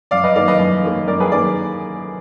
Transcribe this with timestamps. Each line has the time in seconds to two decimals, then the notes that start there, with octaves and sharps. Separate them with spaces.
0.11 F#2 D5 F5
0.24 B4 D#5
0.36 D#3 F#3 A#3 D5 F5
0.48 B4 D#5
0.59 F#2
0.83 D#3 F#3 A#3
1.07 F#2 A#4 D5
1.20 G#4 B4
1.32 D#3 F#3 A#3 A#4 D5